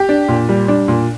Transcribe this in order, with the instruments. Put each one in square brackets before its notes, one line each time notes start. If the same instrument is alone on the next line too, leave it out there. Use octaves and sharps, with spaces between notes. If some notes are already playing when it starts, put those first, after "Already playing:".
Already playing: [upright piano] G4
D4
A#2
G3
D4
A#2